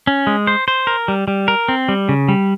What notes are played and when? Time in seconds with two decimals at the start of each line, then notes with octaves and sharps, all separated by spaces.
0.07 C#4
0.27 G#3
0.47 C5
0.68 C5
0.87 A#4
1.08 G3
1.28 G3
1.48 A#4
1.68 C4
1.89 G3
2.09 C#3
2.28 G3